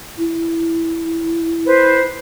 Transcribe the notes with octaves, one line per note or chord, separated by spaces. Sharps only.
E4
B4 C5